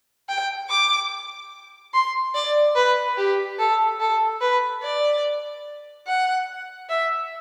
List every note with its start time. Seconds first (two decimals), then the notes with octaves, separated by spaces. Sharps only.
0.29 G5
0.70 D6
1.94 C6
2.34 D5
2.75 B4
3.17 G4
3.59 A4
4.00 A4
4.41 B4
4.83 D5
6.07 F#5
6.89 E5